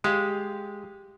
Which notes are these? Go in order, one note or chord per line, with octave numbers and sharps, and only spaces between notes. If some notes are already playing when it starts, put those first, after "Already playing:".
G#3 G4 F5